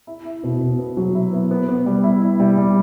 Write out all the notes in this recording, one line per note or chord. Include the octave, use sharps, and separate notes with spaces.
E4
E4
B2
B2
B3
F#3
E4
B3
B3
B3
G3
E4
E4
G3
G3